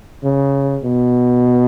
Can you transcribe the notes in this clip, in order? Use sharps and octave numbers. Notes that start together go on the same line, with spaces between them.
C#3
B2